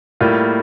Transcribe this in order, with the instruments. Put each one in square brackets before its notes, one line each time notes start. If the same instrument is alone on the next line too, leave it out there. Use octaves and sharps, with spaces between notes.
[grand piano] A2 G3 A#3 F4